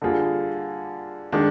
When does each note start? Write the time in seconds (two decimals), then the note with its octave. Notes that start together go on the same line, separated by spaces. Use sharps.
0.02 D3 G3 A#3 F4 G#4
1.32 D#3 G#3 D4